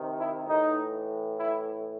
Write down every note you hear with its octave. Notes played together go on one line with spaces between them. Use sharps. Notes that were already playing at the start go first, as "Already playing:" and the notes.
Already playing: C3 D#3
E4
A2 E3 D#4
E4